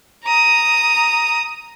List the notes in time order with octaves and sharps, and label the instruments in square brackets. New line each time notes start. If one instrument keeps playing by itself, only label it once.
[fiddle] A#5 D#6